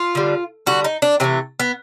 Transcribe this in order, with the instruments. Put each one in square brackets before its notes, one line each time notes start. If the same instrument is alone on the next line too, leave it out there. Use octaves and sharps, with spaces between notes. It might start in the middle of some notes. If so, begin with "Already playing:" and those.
Already playing: [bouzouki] F4
D3 G3
D3 G3 F#4
D#4
D4
C3 E3 A3 C4
B3